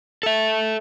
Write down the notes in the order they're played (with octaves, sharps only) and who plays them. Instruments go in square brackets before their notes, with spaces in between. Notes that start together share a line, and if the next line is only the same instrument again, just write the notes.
[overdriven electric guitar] A4 E5